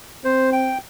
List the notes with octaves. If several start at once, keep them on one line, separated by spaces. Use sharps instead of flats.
C4 C5
G5